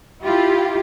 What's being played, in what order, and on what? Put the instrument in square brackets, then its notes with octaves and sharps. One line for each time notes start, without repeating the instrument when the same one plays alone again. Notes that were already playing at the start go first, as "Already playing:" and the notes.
[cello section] E4 F4 G4